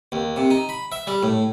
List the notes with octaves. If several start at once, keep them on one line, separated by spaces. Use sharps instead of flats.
D#2
C3
D#4
B5
E5
G3
A2